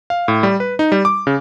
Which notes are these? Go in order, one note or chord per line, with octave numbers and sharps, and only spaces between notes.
F5
A2
G3
B4
D#4
G3
D6
C#3